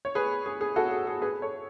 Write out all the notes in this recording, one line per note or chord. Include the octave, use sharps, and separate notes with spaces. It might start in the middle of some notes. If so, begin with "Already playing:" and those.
C#5
G#4 B4
G#4
G#4
F#4 A4
G#4
G#4
G#4 B4
A4 C#5